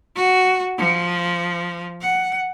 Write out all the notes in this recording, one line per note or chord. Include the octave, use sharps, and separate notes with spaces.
F#4
F3
F#5